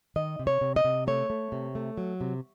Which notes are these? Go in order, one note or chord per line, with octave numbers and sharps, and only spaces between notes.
D#3 D#5
C3
C#5
C3
D#5
C3
A3 C#5
A3
C3
A3
F#3
C3